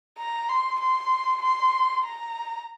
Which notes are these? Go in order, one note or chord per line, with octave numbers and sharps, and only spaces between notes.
A#5
C6
C6
C6
A#5